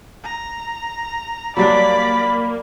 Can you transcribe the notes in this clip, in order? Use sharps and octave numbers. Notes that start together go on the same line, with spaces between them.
A#5
F#3 G3 A#3 D4 D5 B5 B6